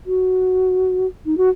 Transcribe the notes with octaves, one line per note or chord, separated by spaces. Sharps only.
F#4
D#4
F#4